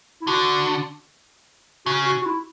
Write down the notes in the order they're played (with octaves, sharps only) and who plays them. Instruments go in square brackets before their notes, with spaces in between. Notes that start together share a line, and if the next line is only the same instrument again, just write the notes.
[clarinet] E4
[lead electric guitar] D3 [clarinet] F#4
[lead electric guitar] C#3 [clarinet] F#4
[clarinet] F#4
F#4
E4